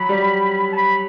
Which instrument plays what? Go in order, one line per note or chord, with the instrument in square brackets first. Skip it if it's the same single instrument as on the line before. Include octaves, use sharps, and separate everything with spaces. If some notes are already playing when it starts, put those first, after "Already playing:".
Already playing: [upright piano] F#3 [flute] B5
[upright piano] G3
[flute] A5
B5